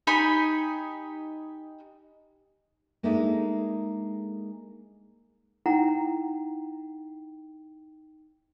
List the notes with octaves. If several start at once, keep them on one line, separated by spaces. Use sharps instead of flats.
D#4 G4 G#5 B5
G#3 A#3 D4 D#4 A4 E5
D#4 E4 F#5 G5 A#5